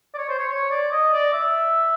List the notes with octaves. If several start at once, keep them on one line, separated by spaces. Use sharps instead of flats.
D5
C#5
C5
C#5
C#5
D5
D#5
D5
E5